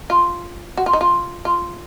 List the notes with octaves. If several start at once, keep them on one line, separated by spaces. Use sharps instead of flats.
F4
F#4
F4
D#4
F4
F4